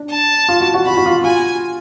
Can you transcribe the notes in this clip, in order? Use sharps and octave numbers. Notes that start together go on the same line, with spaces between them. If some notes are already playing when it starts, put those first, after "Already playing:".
Already playing: D4
A5
F4
F#4
F#4
F#4 B5
F#4
F4
F4 G#5